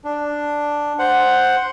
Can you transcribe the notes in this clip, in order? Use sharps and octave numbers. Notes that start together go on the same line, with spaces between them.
D4
C5 F#5